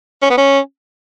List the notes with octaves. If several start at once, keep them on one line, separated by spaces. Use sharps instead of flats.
C#4
B3
C#4